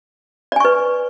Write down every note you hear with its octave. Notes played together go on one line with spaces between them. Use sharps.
B4 D5 G#5 C#6